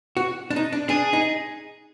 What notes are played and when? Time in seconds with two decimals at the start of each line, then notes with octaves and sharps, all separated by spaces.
0.17 F#4
0.51 D4
0.56 D#4
0.73 D4
0.89 D4 G#4
1.13 D#4